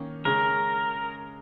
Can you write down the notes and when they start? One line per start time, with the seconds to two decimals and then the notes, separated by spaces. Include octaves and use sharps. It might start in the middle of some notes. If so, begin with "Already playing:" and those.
Already playing: D#3 A#3 C#4
0.25 C#3 G#3 C#4 A#4